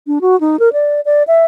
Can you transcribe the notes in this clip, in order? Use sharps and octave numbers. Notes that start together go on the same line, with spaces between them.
D4
F#4
D#4
A#4
D5
D5
E5